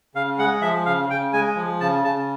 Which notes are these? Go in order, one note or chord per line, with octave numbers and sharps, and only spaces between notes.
C#3 F5
G#3 F#5
F3 E5
C#3 F5
C#3 G5
G#3 G#5
F3
C#3 A5
C#3 A5